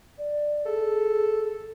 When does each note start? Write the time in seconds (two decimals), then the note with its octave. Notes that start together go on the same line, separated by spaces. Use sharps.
0.18 D5
0.66 G#4 A4